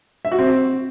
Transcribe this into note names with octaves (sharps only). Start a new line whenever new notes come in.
E5
F#4
C4